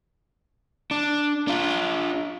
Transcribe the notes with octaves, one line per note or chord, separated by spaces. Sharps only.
D4
D4 F4